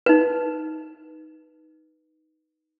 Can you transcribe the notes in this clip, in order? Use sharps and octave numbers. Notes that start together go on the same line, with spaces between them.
D#4 B4